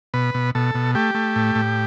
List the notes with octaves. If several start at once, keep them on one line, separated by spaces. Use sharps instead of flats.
B2 B4
B2
B2 A4
B2
A3 G4
A3
A2
A2